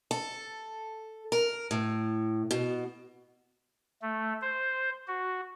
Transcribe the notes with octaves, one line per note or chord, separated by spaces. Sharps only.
A4
A#4
A2
B2
A3
C5
F#4